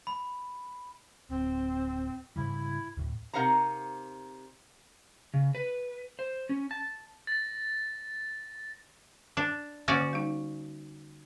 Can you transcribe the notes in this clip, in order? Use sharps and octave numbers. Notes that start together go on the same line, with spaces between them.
B5
D1 C4
G#2 C#3 G3 E4
D2 A2
C3 D#4 A#4 F5 F#5 A#5
C#3
B4
C5
C#4
A5
A6 A#6
D4
D3 A#3 C#4 F#4 D5
G3 D#4